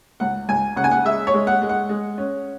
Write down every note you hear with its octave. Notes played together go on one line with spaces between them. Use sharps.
C#2 F#5
C#2 G#5
C#3 F#5
G#5
F#5
G#3 E5
C#5
G#3
F#5
G#3
F#5
G#3
C#4